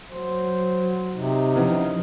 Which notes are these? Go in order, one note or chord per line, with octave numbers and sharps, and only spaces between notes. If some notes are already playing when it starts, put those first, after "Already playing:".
F#3 C5
C3 D#4
C#3 E3 F3 B3